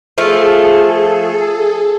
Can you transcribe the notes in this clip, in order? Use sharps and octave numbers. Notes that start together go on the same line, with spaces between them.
F3 A3 G#4 A4